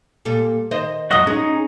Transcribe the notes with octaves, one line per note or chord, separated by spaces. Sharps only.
A#2 G3 A4
D#3 C5 D#5
F2 G#2 F#3 F#4 D#5 D#6
C#4 D#4 G#4